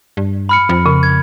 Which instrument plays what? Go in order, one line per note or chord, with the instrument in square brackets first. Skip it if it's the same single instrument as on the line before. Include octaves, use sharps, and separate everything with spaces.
[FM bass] G2
[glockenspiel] B5 F6 C#7
[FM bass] F2
[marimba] C#3
[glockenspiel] G#6